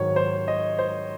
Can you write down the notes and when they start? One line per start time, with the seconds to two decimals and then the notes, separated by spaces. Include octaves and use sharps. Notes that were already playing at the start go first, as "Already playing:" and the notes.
Already playing: G#2 D#3 F#3 C#5
0.16 C5
0.48 D#5
0.79 C5